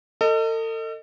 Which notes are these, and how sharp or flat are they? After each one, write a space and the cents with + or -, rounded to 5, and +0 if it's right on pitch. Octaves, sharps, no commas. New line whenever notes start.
A4 +40 D#5 +0